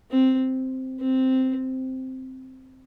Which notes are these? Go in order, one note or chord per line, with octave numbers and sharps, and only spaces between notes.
C4
C4